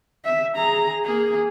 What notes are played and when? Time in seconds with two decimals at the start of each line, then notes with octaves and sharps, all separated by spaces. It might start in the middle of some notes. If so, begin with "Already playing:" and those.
0.25 E5
0.55 G#4 A#5
1.04 A#3 G#4